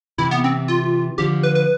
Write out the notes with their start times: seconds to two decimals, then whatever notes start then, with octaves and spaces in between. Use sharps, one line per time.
0.18 C3 E3 E4
0.31 B3
0.44 C4
0.68 F4
1.18 D3 F3 G4
1.43 B4
1.55 B4